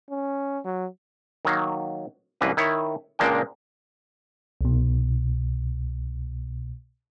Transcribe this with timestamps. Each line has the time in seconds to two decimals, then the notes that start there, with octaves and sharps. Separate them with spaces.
0.10 C#4
0.65 F#3
1.45 D#3 F#3 A#3
2.41 C2 F#2 E3 A#3 B4
2.57 D#3 E4 C#5
3.19 C#2 A#2 G#3 A#3 D4 G5
4.61 C2 B2